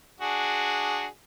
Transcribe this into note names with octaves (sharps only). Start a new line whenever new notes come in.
D4 F#4 G#4